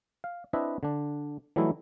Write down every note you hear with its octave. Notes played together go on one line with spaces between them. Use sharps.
F5
C4 D4 E4 B4 D#5 E5
D3 D4
E3 F#3 G3 A3 D#4 E4